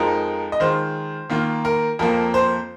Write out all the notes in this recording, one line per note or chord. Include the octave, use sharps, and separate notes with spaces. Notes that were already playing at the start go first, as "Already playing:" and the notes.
Already playing: F2 F3 G#3 D#4 A#4
D#5
D#3 G#3 F4 C5
D#3 A#3 F4
A#4
F2 F3 A#3 A#4
C5